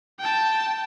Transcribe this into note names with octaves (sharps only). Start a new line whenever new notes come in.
G5 A5